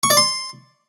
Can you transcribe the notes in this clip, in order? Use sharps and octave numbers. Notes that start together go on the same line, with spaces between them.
C#6
D5
C6